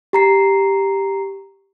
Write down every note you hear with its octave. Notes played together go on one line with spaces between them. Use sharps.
G4 A#5 C7